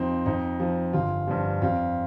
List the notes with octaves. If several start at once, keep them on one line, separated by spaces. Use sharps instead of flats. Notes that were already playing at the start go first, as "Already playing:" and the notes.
Already playing: F2 F3 C4 D#4
F2 D#4
F3
G1 F4
G2 F3
F2 F4